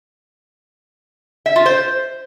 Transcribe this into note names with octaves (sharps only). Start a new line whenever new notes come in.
E5
F4
C5